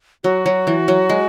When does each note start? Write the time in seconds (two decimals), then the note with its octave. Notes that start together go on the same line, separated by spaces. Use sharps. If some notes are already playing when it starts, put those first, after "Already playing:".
0.24 F#3 F#4
0.46 F#3
0.67 E3
0.88 F#3
1.09 G#3